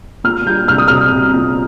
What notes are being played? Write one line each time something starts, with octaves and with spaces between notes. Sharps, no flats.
A#2 F6
G3 G6
C2 F6
D#6
C2 F6
C2
A#2